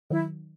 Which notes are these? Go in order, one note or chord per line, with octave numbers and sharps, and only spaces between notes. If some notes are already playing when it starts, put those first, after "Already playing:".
D#3 F#3 E4